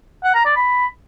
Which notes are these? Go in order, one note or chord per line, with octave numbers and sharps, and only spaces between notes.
F#5
A#5
D5
B5